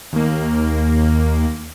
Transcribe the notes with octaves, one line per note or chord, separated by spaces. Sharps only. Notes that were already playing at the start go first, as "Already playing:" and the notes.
D#2 A#3